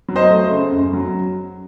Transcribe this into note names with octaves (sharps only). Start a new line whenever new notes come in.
F#3
C5 D#5
A3
C#3
F#2
F#3